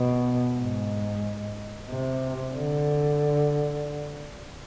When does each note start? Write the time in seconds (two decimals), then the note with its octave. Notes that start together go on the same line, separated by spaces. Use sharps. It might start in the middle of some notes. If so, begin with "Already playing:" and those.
Already playing: B2
0.58 G#2
1.89 C3
2.54 D3